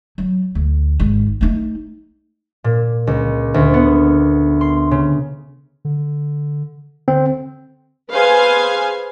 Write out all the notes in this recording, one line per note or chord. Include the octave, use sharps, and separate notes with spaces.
F#3
D2
G#1
A3 D#4
A#2
C#2
D2
B3
C6
C#3
D3
D3 C4
G#4 B4 C5 F5 G#5